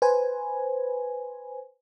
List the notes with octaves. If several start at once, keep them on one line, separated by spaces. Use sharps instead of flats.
B4 C5 G#5